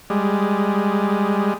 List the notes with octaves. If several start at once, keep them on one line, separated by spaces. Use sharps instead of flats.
G3 G#3